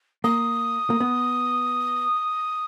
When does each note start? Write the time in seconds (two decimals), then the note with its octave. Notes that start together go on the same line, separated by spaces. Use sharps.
0.24 A#3 D#6
0.90 A#3
1.00 B3